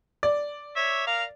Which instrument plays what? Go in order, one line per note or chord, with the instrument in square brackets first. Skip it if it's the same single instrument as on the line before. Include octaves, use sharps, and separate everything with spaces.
[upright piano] D5
[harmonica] C#5 E5
A#4 F5